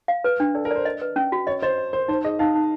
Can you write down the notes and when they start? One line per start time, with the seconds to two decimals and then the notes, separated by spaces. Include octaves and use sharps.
0.08 F5
0.24 B4
0.40 D4
0.55 A4 D5
0.65 A#4
0.71 C5 D5
0.85 D#5
1.02 B4
1.16 C#4
1.32 F#4
1.47 C#5 D#5
1.62 C5 D#5
1.78 D#5
1.93 A#4 C5
2.08 D#4 C5
2.24 G#4 D#5
2.39 D#4 F5
2.55 D#4